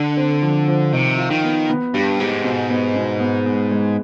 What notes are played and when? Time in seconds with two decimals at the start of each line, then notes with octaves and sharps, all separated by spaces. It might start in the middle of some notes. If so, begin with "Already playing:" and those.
Already playing: D3
0.17 C4
0.42 F3
0.68 F3
0.93 C3 D#3
1.18 F4
1.31 D#3
1.44 B3
1.69 B3
1.94 G2 G3
2.20 G#2 G4
2.44 B2
2.70 B3
2.96 B2
3.20 B3
3.46 B3
3.71 G#3